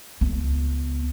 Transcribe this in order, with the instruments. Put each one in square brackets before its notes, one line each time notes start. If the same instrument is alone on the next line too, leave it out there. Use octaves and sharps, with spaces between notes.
[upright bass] C#2 B3